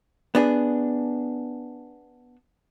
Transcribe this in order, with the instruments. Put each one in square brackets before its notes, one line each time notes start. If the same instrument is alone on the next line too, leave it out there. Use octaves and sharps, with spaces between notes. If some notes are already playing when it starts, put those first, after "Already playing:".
[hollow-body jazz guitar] B3 D4 G#4